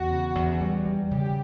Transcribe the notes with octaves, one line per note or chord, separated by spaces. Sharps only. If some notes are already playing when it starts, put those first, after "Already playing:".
Already playing: E2 F#4
C#3
E2
G3
G3
C#3 G4